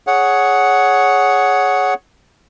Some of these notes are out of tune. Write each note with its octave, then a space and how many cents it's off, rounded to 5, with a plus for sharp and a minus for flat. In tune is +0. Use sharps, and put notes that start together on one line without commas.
G#4 +10 C#5 +5 F#5 +0